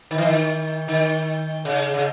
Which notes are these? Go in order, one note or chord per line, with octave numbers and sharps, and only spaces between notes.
D#3
E3
D#3
D#3
C#3
C#3